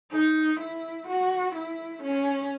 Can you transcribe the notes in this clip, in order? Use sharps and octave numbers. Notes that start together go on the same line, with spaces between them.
D#4
E4
F#4
E4
C#4